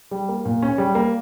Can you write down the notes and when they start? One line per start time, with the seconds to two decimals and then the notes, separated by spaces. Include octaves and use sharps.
0.11 G3
0.29 A#3
0.45 A#2
0.63 C#4
0.78 G3
0.95 A#3